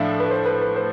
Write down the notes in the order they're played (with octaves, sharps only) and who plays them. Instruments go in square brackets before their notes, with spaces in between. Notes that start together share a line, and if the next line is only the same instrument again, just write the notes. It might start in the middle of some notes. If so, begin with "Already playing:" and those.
Already playing: [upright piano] A2 F3 D4 [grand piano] E5 F5
[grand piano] B4
C5
B4
B4
C5